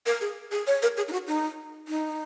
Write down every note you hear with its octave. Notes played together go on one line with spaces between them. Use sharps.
A#4
G#4
G#4
C#5
A#4
G#4
D#4
F#4
D#4
D#4